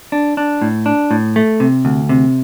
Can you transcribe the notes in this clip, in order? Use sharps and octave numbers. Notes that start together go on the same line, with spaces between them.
D4
D4
A2
D4
A2
A3
C3
D2
C3